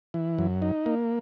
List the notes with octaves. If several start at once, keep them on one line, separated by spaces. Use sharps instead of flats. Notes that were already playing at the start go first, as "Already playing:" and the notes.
E3
F#2
D#4
A#3